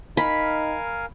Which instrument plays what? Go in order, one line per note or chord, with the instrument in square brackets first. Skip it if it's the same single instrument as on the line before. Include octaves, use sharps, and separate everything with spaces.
[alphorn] D#4 [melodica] A#4 F5 G#5 [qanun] B5